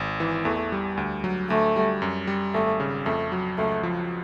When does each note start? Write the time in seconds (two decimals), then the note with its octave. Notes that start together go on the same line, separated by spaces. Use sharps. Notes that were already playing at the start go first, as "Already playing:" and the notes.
Already playing: G#1
0.20 E3
0.45 E2 A3
0.72 G3
0.97 D2
1.24 F#3
1.50 D2 A3
1.76 G3
2.02 F#2
2.27 G3
2.54 G#1 A3
2.80 C#3
3.06 F2 A3
3.32 F#3
3.58 C#2 A3
3.83 F3